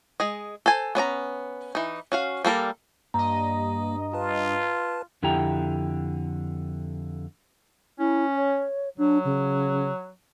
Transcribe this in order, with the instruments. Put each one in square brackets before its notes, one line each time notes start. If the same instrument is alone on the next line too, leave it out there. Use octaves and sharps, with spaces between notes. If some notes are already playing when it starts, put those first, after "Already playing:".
[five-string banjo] G#3 G#4 D#5
A4 C5 G#5
B3 C#4 D5 A#5
E3 D#4
C#4 F#4 F5
G3 A#3 A4 A#4
[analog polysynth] G2 D#5 [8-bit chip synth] A#3 [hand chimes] A#5
[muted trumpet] F4 [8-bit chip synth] B4 A5
[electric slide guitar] F2 D3 E4 G4 G5 A#5
[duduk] C#4 [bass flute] E4
[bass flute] C#5
[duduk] F#3 [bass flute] D4
[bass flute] C#3